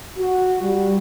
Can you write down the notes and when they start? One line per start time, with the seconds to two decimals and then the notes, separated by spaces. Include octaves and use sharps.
0.18 F#4
0.62 G3